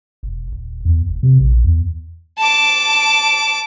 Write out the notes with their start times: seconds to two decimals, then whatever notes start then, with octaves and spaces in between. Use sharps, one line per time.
0.23 E1
0.52 D#1
0.85 E2
1.09 E1
1.23 C3
1.40 A#1
1.64 E2
2.38 A5 D6